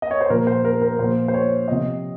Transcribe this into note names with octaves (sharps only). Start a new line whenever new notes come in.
D#5
C#5
C5
A#2 F3 A#4
C5
A#4
A#4
A#2 F3 C5
C5
C#5
C3 F3 D#5